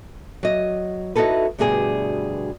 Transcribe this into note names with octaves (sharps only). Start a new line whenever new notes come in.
F#3 D#5
D#4 E4 F#4 A4 B4
D2 G2 B2 G#4 G#5